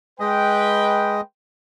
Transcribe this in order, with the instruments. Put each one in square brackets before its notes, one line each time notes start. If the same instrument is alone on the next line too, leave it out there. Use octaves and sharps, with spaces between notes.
[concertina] G#3 D#5 [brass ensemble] B4 G5